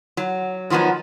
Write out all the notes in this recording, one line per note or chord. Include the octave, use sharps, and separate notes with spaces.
F#3
D#3 F3 F#3 B3 D#4